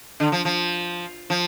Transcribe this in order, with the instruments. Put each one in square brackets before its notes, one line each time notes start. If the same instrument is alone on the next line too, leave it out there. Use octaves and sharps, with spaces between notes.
[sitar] D3
F3
F3
F3